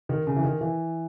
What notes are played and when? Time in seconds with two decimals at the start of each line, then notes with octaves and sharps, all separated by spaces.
0.09 D#3
0.27 C#3
0.36 E3
0.44 D#3
0.61 E3